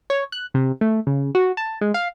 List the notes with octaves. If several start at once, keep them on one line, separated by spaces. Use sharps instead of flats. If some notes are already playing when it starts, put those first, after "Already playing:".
C#5
F#6
C3
A3
C#3
F#4
A5
G#3
F5